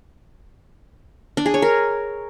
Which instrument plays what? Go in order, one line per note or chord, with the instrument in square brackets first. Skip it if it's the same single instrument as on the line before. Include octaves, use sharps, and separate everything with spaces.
[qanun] D4
G#4
C#5
A#4